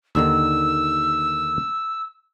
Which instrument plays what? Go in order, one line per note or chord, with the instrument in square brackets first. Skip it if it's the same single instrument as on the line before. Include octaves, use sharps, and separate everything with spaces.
[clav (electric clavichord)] D#2 D3 D#3 [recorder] E6